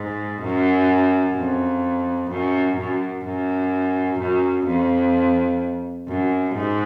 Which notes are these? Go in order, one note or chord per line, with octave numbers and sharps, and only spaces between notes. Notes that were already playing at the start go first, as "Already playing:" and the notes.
Already playing: G#2
F#2
F2
F#2
F#2
F#2
F#2
F2
F#2
G#2